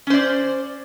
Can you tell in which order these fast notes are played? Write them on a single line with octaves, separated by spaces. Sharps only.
C#4 C5 D5